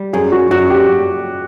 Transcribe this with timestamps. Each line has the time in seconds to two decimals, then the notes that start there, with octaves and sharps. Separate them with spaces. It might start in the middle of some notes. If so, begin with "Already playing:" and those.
Already playing: G3
0.13 F#2 G#4
0.32 F#4
0.51 F#2 F#4
0.70 G4